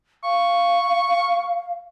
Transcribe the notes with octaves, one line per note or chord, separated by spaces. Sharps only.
F5 C#6